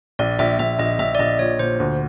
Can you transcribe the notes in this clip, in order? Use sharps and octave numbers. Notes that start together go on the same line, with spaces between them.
A#1 D5
A#1 E5
A#1 E5
A#1 D#5
A#1 E5
D5
A#1 D#5
A#2 C#5
A#2 C5
D2